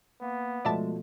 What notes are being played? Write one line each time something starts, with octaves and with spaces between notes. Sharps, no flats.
A#3 B3
B2 F3 G#3 A3 D5 E5 A5